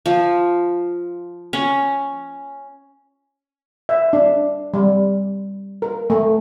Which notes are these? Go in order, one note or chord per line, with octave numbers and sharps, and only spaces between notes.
F3
C#4
E5
D4
G3
A#4
A3